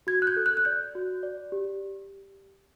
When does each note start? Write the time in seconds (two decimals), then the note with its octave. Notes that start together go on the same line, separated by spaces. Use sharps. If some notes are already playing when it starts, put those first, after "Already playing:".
0.07 F#4 G#6
0.22 F#6
0.27 G6
0.37 A4
0.46 F#6
0.57 F#6
0.65 D5 G6
0.95 F#4
1.23 D5
1.52 G4